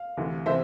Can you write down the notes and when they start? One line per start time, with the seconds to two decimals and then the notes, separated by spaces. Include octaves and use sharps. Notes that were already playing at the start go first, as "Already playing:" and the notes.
Already playing: F5
0.17 D2 C3 E3
0.46 C3 E3 C5 E5